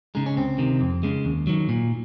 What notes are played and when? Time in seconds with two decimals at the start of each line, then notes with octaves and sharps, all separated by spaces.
0.15 C#3 G#3 D#4
0.26 C#4
0.36 C#2 C4
0.58 C3 D#3
0.81 F2
1.03 C#3 G#3
1.25 D#2
1.47 D#3 F#3
1.69 A#2